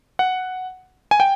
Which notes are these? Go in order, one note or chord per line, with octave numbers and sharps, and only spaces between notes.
F#5
G#5
G5